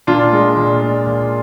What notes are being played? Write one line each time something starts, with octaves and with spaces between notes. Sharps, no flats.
A#2 D4 F4
G#3
A#2
G#3
A#2